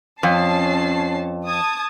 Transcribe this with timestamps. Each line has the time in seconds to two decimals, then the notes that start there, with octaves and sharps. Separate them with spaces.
0.23 F2 C#4 A5 C7
1.47 A5 D#6 G#6